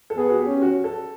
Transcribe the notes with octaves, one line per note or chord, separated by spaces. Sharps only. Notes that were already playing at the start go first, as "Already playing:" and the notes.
A4
B3 G#4
F#4
G4
C#4
F#4
A4